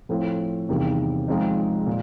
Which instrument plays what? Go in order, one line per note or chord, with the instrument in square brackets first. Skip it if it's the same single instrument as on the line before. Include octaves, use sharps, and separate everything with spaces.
[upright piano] A2 F3 A3 C4
E2 C3 D#3 G3 A#3
F3 G#3 C4 D#4
A#2